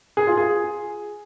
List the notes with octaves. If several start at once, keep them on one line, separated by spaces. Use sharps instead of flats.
G#4
F4
G#4